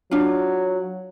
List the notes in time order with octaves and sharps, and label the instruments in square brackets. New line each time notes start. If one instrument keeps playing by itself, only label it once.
[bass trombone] F#3 [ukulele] D4 F4